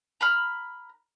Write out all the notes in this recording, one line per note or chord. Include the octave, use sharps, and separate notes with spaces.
A#5 B5 F6